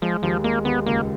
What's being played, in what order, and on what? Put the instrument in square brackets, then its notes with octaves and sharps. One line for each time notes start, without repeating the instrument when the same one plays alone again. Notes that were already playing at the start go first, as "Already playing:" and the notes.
[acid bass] F3 [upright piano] G#3
[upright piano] D#2 [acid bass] F3
[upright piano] G#3 [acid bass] A#3
[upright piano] D#2 [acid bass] B3
[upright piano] C#2 [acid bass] A#3